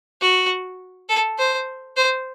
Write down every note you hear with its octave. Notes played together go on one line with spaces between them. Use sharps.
F#4
A4
C5
C5